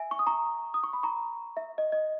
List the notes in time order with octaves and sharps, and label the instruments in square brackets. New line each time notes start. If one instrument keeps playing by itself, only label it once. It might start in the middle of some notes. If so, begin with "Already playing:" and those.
Already playing: [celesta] E5 G#5
C#6
D#6
A#5 C#6
D#6
C#6
B5
A#5 C#6
E5
D#5
D#5